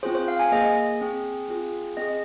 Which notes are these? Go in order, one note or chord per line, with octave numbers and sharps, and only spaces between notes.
C4 F4 G#4 C5
C5
F5
G#5
A#3 G#4 D#5
C4 G#4
C4 F4 G#4
C4 G#4 D#5